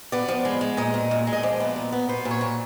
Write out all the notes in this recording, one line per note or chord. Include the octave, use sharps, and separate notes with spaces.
B3 D5
F3
G#3
G#3
A#2 D#5
A#2
A#2
G#3
D#5
F3 D5
B3
A#2
B3
B3 C5
A#2
C#5
A#2